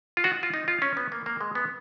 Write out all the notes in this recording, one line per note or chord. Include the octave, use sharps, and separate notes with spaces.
F4
F#4
F4
D#4
F4
C#4
B3
A#3
A#3
G#3
B3